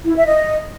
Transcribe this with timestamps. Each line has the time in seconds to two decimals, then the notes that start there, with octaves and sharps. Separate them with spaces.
0.05 E4
0.16 E5
0.26 D#5